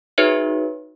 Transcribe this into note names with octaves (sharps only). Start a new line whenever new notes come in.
D#4 F#4 G#4 B4 C#5 E5